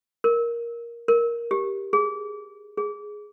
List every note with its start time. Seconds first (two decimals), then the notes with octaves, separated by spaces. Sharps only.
0.24 A#4
1.08 A#4
1.51 G4
1.93 G#4
2.77 G#4